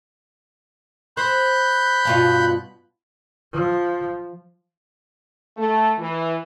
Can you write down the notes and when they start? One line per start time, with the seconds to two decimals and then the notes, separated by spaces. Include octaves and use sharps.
1.17 C5 B5 F#6 G6
2.05 G2 B2 F4
3.53 F3
5.57 A3
5.98 E3